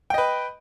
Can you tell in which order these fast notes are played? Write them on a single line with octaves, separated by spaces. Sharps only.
G5 D#5 B4